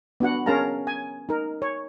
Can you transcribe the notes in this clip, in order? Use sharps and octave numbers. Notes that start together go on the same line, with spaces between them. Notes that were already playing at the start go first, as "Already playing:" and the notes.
B3 D4 F#4 F#5
C#4 G#4 A#4 F5 A5 A#5
G#5
D#4 A#4
C#5